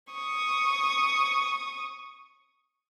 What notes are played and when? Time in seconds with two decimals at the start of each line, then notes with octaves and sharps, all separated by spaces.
0.12 C#6 D#6